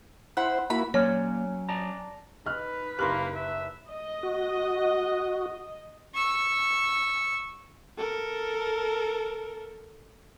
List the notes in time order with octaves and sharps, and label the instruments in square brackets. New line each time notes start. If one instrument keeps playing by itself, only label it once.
[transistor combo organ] E4 C5 [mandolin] F#5 B5
[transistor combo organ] A#3 E4 F#4 [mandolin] B5
[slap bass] F#3 [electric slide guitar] A#3 D5 [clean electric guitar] C#4 [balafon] C#5
[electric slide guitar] D5 A5 A#5
[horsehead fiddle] D#4 B4 [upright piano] D#5 F6 F#6
[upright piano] F#1 F#6 [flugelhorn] A#3 [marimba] G4 B5 C6
[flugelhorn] E5
[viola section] D#5
[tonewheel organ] F#4
[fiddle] C#6 E6
[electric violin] A4 A#4